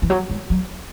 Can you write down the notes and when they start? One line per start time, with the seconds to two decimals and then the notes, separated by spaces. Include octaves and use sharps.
0.02 E3
0.10 F#3
0.30 G#3
0.50 F#3